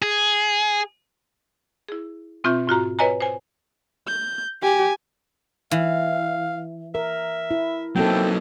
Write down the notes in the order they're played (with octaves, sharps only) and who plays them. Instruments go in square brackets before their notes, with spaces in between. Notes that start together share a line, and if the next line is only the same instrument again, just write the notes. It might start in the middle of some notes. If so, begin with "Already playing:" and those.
[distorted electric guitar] G#4
[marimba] E4 G#4
B2 C4 F4 E5 C#6 G6
G#2 F4 F#4 A#5
B4 C#5 D#5 G#5 A#5
C5 G#5
[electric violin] G6
[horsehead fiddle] G4 [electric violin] G#5
[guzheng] E3 [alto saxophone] F5
[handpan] A#4 [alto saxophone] E5
[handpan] E4
[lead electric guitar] F#3 D#4 [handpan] A#3 C4 A4 [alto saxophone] G5